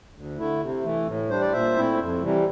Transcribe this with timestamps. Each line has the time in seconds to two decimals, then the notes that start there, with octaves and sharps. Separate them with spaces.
0.15 D2
0.38 D3 A3 E4
0.61 C3
0.84 E3 A3
1.07 A2
1.29 G3 D4 C5
1.41 D5
1.53 A#2 C5 E5
1.76 A3 C4 E4
1.99 F2
2.22 C3 E3 G3